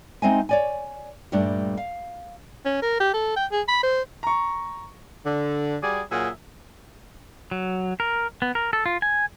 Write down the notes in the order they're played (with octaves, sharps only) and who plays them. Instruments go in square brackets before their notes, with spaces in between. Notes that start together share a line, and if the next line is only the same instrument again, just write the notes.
[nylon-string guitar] G#3 C4 D#4 C5 E5 G#5
C#5 D5 G#5
G2 A#2 G3 A3 D4
F5
[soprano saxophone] C#4
A#4
G4
A4
G5
G#4
B5
C5
[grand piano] A#5 C#6
[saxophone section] D3
G3 F#4 G#4 D5
A#2 F#3 G#4 A#4 E5
[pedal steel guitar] F#3
A#4
B3
A#4
A4
F4
G#5